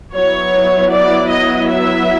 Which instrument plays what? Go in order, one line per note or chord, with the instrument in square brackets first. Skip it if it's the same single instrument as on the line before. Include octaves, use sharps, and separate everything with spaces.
[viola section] F#3 B3 E4 C#5
D5
D#5
E5